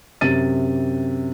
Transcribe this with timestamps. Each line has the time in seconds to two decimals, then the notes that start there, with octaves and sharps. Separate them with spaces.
0.21 F#2 C3 A6 D#7